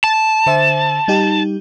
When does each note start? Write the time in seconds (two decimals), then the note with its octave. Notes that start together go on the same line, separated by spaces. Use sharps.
0.04 A5
0.46 D3 C5 E5
1.08 G3 D#4 G4